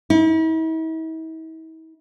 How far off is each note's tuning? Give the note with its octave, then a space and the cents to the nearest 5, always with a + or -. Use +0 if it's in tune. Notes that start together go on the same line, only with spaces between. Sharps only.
E4 -45